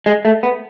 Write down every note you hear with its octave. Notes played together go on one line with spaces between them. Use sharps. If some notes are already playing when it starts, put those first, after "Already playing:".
G#3
A3
B3